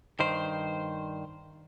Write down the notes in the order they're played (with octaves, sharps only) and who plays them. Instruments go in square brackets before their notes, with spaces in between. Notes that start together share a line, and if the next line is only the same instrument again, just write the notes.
[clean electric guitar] G2 D#3 C5